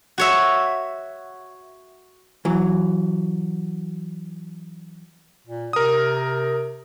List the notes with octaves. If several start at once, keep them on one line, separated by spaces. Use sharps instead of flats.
F#4 C#5 E5
E3 F#3
A#2
C3 A#4 D#6